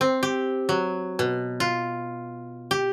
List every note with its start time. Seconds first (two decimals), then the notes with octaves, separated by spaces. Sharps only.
0.01 C4
0.23 G4
0.69 F#3
1.19 B2
1.60 F4
2.71 G4